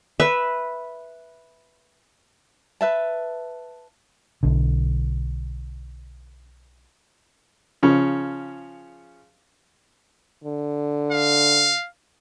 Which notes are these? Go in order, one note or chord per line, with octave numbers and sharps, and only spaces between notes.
B4 E5
B4 E5 A5
B1 D3
C#3 F3 C#4
D3
F5